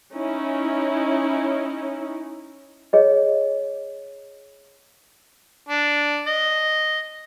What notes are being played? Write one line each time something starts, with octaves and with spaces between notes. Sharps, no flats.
C#4 D#4 E4
G#4 C#5 D#5
D4
D#5